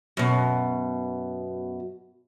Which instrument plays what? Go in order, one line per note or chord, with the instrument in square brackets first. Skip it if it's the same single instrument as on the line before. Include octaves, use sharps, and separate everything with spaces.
[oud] F#2 B2